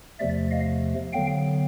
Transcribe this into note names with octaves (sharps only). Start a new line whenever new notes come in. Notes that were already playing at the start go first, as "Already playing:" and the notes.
E2 C3 F3 A3 D5 E5
D#5 F5
D3 F#3 B3 F5 G5